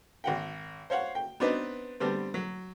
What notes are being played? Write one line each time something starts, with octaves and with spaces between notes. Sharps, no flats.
G#1 F#5 G5
C5 C#5 F5 F#5
G5
B3 C4 D4 D#4 B4
D3 G3 B3 C4
F#3